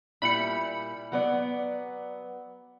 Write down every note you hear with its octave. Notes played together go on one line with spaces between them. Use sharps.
A#2 G3 E4 B5 C#7
F#3 B3 D5